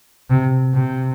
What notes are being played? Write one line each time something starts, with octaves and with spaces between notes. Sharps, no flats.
C3
C3